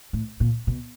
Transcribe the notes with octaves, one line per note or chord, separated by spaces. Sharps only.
A2
A#2
B2